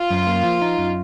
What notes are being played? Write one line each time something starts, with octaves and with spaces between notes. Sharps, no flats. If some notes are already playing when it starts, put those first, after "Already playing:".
Already playing: F4
F#2
A#3
F3
D#4
F#2